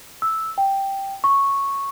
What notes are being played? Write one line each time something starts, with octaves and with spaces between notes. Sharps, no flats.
E6
G5
C#6